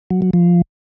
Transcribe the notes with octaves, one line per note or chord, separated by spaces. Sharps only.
F#3
F#3
F3